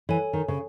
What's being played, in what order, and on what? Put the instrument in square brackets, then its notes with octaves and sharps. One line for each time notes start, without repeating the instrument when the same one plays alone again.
[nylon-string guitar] E3 [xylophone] A4 C#5 G#5
[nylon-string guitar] D#3
C#3